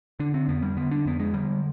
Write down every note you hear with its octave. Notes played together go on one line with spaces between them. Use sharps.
D3 D4
C4
F2 B3
G3
D3 B3
D4
F2 B3
G#3
D3 G3